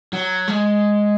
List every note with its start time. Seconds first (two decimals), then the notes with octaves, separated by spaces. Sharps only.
0.13 F#3
0.48 G#3